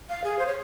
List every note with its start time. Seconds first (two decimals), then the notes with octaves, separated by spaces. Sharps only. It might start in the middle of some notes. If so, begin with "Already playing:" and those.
0.09 F5
0.24 G#4
0.38 C5
0.46 C#5